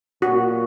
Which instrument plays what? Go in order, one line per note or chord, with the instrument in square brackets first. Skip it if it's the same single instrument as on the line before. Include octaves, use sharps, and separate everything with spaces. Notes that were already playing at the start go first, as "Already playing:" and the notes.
[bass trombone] A#2 [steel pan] F#4